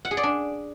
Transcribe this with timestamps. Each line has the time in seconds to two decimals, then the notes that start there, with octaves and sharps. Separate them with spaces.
0.05 F#5
0.11 G#4
0.17 D5
0.23 D4